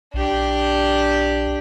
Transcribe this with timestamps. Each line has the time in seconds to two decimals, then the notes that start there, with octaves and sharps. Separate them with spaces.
0.14 A#1 D4 G4